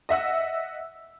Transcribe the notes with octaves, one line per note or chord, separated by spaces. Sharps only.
D#5 E5 F#5 E6